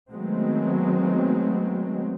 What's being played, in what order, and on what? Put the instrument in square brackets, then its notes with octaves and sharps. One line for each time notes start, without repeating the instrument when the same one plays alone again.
[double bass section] D#3 F#3 G#3 A3 B3 C4